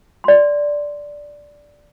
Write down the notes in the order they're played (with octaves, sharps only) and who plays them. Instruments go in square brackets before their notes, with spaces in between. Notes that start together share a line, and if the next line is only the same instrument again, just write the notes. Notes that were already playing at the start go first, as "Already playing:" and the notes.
[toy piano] D5 C6